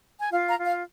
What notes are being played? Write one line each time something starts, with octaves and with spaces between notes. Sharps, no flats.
G#5
F4 F5
F5 A#5
F4
F5